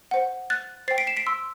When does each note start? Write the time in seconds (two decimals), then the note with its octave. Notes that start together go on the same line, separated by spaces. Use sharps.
0.11 C5 F#5
0.50 F#6 A6
0.88 C5 A6 C7
0.91 G5
0.98 B6 D7
1.07 C7 E7
1.17 B6 D7
1.26 C6 E6